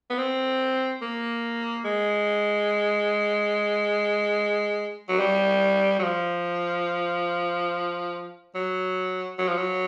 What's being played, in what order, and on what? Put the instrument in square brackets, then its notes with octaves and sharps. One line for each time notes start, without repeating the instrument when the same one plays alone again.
[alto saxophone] B3
C4
A#3
G#3
F#3
G3
F#3
F3
F#3
F#3
F3
F#3